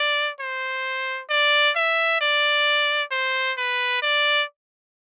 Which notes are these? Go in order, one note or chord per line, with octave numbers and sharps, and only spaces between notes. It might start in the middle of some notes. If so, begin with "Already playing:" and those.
Already playing: D5
C5
D5
E5
D5
C5
B4
D5